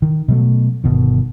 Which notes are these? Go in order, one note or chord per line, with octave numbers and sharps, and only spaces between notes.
D#3
B2 F#3 A3
G1 B2 D#3